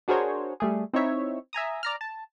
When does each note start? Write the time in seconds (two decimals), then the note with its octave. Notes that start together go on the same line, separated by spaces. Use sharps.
0.08 D4 F#4 G#4 A#4 C5 C#5
0.60 G3 A3 G#4
0.94 C4 D#4 E4 C#5 E5
1.53 E5 G#5 A#5 D#6
1.83 D5 A#5 F6
2.01 A5